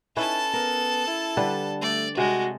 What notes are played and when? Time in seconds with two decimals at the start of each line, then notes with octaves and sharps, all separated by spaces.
0.17 C#4 D#4 E4 A4 B4 A5
0.53 B3 A#4
1.07 E4
1.37 D3 G3 B4
1.82 A3 D5
2.17 C3 G#3 F#4 A4